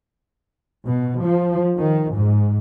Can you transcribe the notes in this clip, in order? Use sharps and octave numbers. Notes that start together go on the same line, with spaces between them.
B2
F3
D#3
G#2